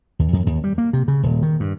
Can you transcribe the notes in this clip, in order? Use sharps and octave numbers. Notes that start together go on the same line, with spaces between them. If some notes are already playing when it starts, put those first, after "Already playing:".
D#2
F2
D#2
G3
A#3
C3
C#3
D#1
D#3
G2